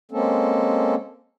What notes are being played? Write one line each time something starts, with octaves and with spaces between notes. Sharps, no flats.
G#3 A#3 C4 C#4 A4